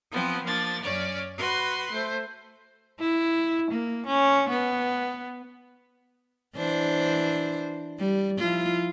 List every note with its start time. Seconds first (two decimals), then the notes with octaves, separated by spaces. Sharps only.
0.11 F3 B3 C4
0.44 F3 A#3 D4 A6
0.83 F#2 C#4 C#5 D5
1.38 F#4 B4 B5 C6
1.91 A3 C5
3.00 E4
3.71 A#3
4.07 C#4
4.49 B3
6.55 E3 D4 C5
7.99 G3
8.38 F3 E4 F4